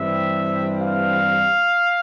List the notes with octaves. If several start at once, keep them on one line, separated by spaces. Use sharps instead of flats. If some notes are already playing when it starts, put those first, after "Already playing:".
Already playing: G2 E3 G3 C4 E5
F5